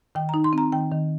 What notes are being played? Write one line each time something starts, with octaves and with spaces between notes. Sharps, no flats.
D#3 G5
D#4 A#5
C6
C4 A#5
D#3 G5
D#3